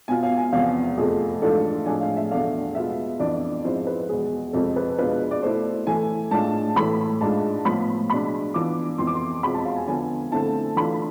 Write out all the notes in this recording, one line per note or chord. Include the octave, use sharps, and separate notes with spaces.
B2 B3 F4 G#5
F5
G#5
E2 C3 F3 B3 F5
F2 C3 F3 A3 G#4
G#2 E3 A3 D4 F4 A4
A2 F3 G#3 D4 G#5
F5
E5
E2 B2 A3 D4 F5
B2 G#3 B3 F4 E5
F2 E3 B3 D4 D5
G#2 F3 G#3 C4 E4 C5
B4
E2 B2 G#3 G#4
F2 C3 F3 G#3 C4 A4
B4
B2 G#3 D4 F4 B4
D5
B2 A3 E4 C5
E3 A3 E4 G#5
A2 G#3 D4 F4 A5
A2 E3 A3 B5
G#2 G#3 D4 F4 A5
A2 F3 B3 F4 B5
B2 G#3 D4 B5
E3 B3 D4 F4 D6
F2 E3 B3 C6
D6
C6
E2 B2 G#3 C4 F4 B5
A5
F5
G#5
D3 F3 B3 F4 G#5
D3 A3 C4 E4 A5
E3 A3 D4 F4 B5